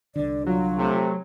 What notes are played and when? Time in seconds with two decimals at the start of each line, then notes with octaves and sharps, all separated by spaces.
0.16 C2 D3 D5
0.46 F#3 F4
0.76 C3 A3